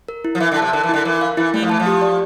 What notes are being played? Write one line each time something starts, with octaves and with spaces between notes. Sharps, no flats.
A#4
E4
F3
E3 E5
D3
A5
C3
D3 A#4
E3
D3 E4
E3 A#4
F5
E3 E4
G3 A3
F3
E3 A5
F3
G4
D5